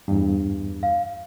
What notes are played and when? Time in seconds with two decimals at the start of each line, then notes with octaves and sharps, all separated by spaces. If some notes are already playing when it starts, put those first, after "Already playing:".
0.08 E2 G2
0.83 F5